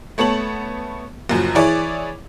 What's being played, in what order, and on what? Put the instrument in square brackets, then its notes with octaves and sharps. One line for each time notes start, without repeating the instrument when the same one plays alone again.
[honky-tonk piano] A3 B3 C#5 A5 F#7
F#1 F#2 F3
E3 E4 G#4 C#5 D5